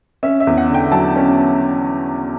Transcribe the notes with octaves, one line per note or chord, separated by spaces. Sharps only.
C#4 E5
E5
E2
F#5
D3 G5
F#3 A5
C#4